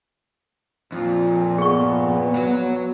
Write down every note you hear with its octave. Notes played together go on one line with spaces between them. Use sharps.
F2 A#2
B3 G#4 C#6
F#3